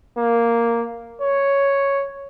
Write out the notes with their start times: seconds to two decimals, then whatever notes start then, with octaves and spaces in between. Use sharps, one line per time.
0.18 A#3
1.22 C#5